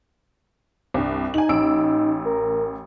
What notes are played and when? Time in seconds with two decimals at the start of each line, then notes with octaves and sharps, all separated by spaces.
0.94 C2 G2
1.34 D#4 G#5 F#7
1.49 A1 E6 D7
2.25 A#4